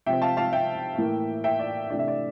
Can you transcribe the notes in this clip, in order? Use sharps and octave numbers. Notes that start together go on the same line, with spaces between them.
C3 F3 C4 E5 G5
F5 A5
F5 A5
E5 G5
A2 E3 A#3
E5 G5
D5
C3 E3 A3 D4 D5
E5
D5